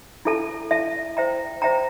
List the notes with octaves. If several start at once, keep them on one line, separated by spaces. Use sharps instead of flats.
E4 A4 E5 A5
E4 A4 E5 A5
C5 E5 G5 A#5
C5 E5 G5 A#5